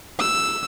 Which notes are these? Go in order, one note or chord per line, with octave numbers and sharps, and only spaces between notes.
E6